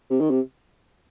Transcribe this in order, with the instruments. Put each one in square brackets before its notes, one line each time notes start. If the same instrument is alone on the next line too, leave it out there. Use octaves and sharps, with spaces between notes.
[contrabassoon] C3
D#3
C3